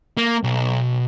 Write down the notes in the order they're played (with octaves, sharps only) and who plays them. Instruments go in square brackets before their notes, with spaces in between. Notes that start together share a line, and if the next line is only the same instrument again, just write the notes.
[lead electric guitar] A#3
B1